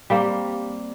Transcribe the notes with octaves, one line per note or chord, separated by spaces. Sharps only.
G3 A#3 C4